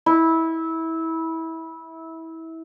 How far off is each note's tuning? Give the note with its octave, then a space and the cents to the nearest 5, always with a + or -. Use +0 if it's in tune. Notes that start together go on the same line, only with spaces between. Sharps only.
E4 -20